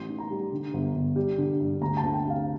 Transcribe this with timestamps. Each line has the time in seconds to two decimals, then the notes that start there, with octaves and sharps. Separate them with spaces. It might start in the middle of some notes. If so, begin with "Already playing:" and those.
Already playing: A1 C6
0.09 D#3
0.18 A#5
0.30 G3
0.52 D3
0.74 G1
0.95 G1
1.16 G3
1.38 D3
1.60 G2
1.81 D2 A#5
1.97 A5
2.03 D2
2.14 G5
2.24 C3
2.30 F5